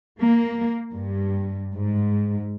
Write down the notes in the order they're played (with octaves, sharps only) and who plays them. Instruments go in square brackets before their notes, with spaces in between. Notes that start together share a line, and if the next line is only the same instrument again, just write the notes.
[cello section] A#3
G2
G#2